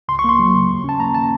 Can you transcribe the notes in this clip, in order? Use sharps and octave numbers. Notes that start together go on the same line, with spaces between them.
C#2 C6
C#6
A#3 C6
F#3
C#3
D#2
C#4 A5
A#3 A#5
D#3 A5